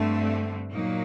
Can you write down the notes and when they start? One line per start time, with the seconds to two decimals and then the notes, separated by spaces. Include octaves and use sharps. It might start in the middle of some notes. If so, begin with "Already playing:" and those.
Already playing: G2 D3 A3 C4
0.71 A#2 F#3 A#3 D#4